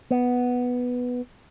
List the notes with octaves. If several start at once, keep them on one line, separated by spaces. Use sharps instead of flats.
B3